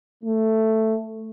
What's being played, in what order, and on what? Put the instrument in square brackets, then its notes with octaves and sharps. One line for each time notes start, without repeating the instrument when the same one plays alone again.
[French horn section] A3